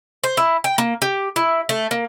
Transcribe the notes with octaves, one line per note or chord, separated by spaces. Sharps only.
C5
E4
G5
A#3
G4
E4
A3
A#3